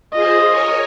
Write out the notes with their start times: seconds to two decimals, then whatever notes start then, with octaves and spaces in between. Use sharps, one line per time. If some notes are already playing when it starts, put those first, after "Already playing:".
0.13 F4 G#4 C5 D#5
0.50 A#4 C#5 G#5